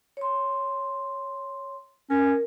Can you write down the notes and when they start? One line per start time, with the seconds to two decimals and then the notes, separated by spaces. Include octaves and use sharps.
0.17 C#5 C6
2.10 C#4 A#4